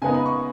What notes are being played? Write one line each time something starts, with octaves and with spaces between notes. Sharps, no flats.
C#3 G#3 B3 D#4 G#5
B5
C#6